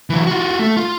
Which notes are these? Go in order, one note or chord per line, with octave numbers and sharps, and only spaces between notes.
E3 F#3
F4 F#4
A3
F4